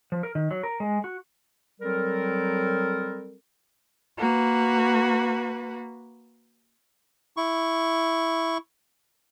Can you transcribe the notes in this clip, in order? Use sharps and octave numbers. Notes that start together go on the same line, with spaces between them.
F3
A#4
D#3
F#3
A#4
G#3
F#4
F#3 G3 C4 A4 A#4
A#3 F#4 B4
E4 C#6